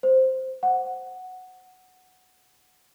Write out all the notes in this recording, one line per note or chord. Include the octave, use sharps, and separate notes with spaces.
C5
F#5